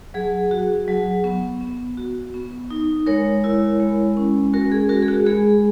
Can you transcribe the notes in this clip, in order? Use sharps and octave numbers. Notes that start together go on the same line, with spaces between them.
F#3 G#4
F#4
F#3
B3
B3
F#4
B3
D#4
G#3 A#4 C#5
E4
G#3
C#4
G#3 F#4 A#4
G#4
F#4 A#4
G#4
F#4
G#3 G#4